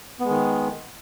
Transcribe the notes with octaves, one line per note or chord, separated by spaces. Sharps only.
D#3 G#3 B3